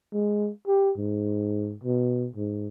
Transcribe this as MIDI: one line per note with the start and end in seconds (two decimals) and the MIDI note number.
0.13 0.50 56
0.67 0.93 67
0.98 1.75 44
1.84 2.28 47
2.36 2.68 44